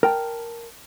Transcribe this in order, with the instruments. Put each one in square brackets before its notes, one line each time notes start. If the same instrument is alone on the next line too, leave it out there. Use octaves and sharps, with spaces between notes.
[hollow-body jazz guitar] A#4 G5 A5